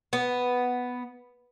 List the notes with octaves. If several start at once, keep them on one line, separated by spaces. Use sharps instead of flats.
B3